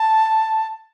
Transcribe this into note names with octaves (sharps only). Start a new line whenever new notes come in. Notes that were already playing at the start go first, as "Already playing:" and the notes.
Already playing: A5